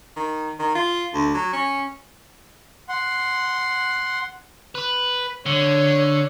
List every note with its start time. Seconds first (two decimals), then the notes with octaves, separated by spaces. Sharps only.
0.16 D#3
0.59 D#3
0.75 F4
1.14 D2
1.34 F#3
1.53 C#4
2.89 F#5 C6
4.75 B4
5.46 D3 C#5